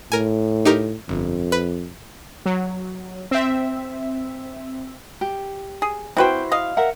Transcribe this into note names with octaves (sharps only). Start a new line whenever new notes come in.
A2 A#4 G#5
D#4 G4 A#4
G1 F2
B4
F#3
C4 E5
G4
G#4
C4 E4 F#4 B4 C5 G5
D#5 F5
A#4 E5 F#5